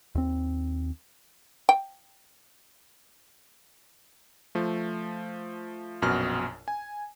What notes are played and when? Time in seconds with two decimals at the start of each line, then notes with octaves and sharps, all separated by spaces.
0.15 D#2 C4
1.69 G5
4.55 F3 A3
6.02 A#1 F#2 B2 F6
6.68 G#5